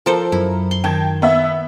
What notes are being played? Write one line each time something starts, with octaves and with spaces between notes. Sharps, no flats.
F3 A4 A#4 C5
F#2 F#3 E4 A#5
C6
D#3 G5 A5 G#6
B3 E5